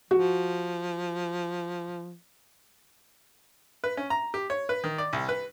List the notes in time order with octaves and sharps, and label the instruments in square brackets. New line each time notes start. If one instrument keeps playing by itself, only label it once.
[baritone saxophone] F3 [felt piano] F#4
[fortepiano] B4
C#4
A#5
G4
C#5
B4
D#3
D5
C2
B4